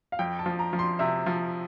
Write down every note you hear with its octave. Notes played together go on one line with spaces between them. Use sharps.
F5
F2 G5
A5
F3
A#5
F3
C6
C3 E5
F3